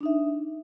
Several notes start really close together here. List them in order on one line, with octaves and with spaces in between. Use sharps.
D4 D#4 E5